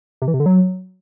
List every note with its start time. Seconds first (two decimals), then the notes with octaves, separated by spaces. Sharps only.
0.22 C3
0.28 E3
0.34 C3
0.40 D3
0.46 F#3